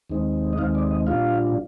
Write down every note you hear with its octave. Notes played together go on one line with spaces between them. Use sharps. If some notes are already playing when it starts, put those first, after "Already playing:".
D#2 D#3 G#3 C4 D#4
D#5
D#2 D#3 G#3 C4 D#4 F5
D5
D#5
A#2 G3 D4 F4 F5